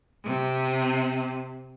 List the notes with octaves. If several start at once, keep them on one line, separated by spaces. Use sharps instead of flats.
C3